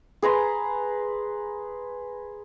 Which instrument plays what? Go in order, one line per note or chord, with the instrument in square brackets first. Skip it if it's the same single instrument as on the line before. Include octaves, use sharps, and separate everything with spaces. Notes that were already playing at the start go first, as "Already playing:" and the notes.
[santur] G#4 B4 A#5 C6